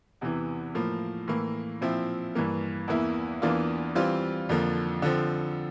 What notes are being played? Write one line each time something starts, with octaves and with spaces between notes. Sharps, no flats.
E2 C3 E3
A2 F3 A#3
A2 E3 A#3
A#2 F3 C4 E4
G2 E3 A#3
E2 E3 A#3 E4
E2 E3 A#3 D4 F4
E3 G3 C4 F4
F2 D3 F3 A#3
D3 F3 C4